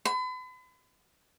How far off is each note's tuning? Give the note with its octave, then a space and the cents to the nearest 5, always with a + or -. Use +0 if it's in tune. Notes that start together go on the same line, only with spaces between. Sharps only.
B5 +40